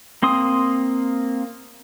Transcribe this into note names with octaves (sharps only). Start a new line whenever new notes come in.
A#3 C4 C6 D#6